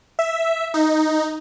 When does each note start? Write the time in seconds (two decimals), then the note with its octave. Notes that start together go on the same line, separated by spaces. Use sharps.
0.19 E5
0.74 D#4